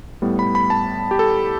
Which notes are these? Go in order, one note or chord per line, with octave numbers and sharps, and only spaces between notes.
A2 G3 B3
B5
B5
A5
G4
A4